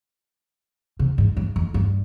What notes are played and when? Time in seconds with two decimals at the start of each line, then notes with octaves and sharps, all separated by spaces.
0.99 C3
1.18 G#2
1.37 G2
1.56 F2
1.74 G2